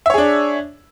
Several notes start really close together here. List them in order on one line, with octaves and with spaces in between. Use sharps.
E5 C#5 G#4 D4